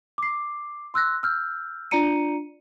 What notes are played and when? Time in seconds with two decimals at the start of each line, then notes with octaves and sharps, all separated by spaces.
0.18 D6 C7
0.94 C6 E6 F#6 A#6
1.23 E6 F6 G6
1.91 D4 F4 D5 A#5 C#7 D#7